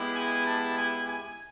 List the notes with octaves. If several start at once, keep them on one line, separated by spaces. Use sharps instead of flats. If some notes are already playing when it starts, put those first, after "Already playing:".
Already playing: G#3 B3 E4 G4
G#5
A5
G#5
G#5